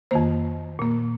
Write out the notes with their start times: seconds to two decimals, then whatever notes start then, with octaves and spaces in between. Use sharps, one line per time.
0.11 F2 D#3 A#3 C5
0.79 A#2 A#3